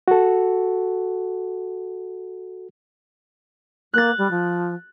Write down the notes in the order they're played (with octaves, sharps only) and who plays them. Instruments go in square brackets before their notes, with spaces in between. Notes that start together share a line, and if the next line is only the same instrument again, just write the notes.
[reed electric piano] F#4 A4
[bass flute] A#3 [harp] F#6 A6
[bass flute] G3
F3